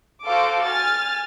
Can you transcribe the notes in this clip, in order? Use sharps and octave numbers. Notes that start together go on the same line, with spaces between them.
F#4 A4 C5 F5 D6
G#5 F6 A6